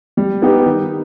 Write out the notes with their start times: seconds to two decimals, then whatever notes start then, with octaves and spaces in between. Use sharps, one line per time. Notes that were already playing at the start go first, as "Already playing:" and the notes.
0.17 G3
0.42 B3 D#4 G4 B4
0.66 D#3